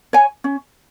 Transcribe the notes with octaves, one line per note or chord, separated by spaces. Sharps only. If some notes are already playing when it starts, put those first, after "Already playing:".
C#5 G#5
C#4